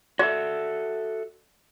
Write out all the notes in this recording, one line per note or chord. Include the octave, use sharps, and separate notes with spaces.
F#4 A4 D5 E5